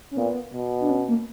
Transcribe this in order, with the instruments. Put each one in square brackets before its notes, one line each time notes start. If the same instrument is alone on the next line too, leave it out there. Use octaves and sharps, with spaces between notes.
[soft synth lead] C#4
[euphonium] A#2 [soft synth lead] B3
[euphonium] B2
[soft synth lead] D4
C#4
A#3